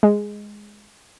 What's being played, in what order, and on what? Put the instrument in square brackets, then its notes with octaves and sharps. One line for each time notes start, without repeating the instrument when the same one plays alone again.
[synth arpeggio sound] G#3